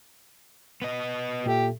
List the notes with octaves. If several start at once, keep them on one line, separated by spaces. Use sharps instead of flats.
B3 D#5
A#2 G4 A4 E5